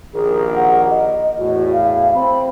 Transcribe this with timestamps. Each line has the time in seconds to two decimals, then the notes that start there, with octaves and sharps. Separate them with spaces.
0.14 A#1 D#2 G#4 A#4
0.55 F#5
0.90 D#5
1.39 E2 A2 F#4
1.73 F5
2.15 C4 B5